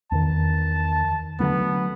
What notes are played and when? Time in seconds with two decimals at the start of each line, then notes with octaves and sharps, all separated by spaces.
0.12 E2 D#3 A5
1.40 D3 F#3 A3 B3